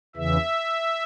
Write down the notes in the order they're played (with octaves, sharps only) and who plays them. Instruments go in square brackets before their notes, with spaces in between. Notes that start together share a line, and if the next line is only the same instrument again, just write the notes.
[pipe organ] E2 C#3 E3 E5